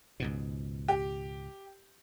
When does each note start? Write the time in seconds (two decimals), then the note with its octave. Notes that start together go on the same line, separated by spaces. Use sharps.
0.20 C#2 G#2 B2
0.88 G4